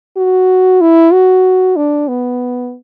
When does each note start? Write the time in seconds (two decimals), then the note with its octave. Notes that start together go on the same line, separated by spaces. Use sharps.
0.17 F#4
0.81 E4
1.12 F#4
1.76 D4
2.08 B3